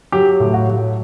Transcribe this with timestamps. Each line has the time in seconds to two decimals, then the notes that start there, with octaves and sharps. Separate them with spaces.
0.12 F#3 G4
0.40 A2
0.54 F#4
0.68 F#3